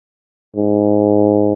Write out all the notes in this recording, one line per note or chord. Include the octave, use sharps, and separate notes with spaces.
G#2